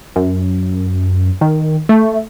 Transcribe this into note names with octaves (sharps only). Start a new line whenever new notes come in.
F#2
D#3
A3